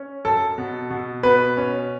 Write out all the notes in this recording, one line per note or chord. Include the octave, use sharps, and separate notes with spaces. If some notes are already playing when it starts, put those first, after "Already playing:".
Already playing: C#4
F#2 A4
B2
B2
B2 B4
C#4